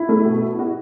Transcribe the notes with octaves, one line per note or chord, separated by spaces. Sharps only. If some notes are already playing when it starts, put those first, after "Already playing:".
Already playing: E4
A3
B2
E4
F#4